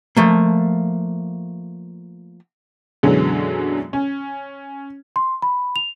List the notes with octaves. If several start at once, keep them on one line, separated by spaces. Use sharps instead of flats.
F3 A3 A#3
F#2 B2 D3 E3 F#3 G#3
C#4
C6
B5
F7